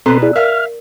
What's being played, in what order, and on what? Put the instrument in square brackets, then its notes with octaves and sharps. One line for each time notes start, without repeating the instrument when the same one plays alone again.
[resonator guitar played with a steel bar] B2 B4 [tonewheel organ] C4 A4 C6 [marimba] A#5
[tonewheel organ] E4 G#4 [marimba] D5
[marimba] A#4 [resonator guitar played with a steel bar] E5 F5 [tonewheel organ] F6